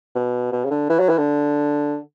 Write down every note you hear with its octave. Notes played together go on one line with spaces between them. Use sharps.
B2
B2
C#3
D3
E3
F#3
E3
D3